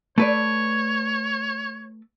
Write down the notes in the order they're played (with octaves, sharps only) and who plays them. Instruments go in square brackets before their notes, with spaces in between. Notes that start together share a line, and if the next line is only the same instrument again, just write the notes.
[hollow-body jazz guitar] A3 B4 D5 [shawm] C#5